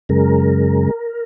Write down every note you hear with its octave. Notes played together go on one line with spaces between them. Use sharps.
F#2 C#3 G#3 A#4